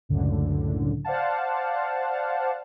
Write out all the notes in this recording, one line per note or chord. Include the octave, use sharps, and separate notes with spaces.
C#2 F#2 A2 D3
C5 D5 F5 F#5 A5